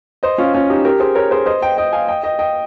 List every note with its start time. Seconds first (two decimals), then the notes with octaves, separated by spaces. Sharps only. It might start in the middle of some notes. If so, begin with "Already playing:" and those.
0.23 C5 D#5
0.38 C#4 F4
0.54 C#4 F4
0.70 D#4 G4
0.85 G4 A#4
1.00 G#4 C5
1.15 A#4 C#5
1.31 G#4 C5
1.46 C5 D#5
1.62 D#5 G5
1.78 D#5 G5
1.93 F5 G#5
2.08 D#5 G5
2.23 D#5 G5
2.39 D#5 G5